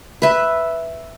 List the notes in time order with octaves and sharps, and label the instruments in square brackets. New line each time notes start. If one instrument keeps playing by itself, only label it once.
[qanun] B4 E5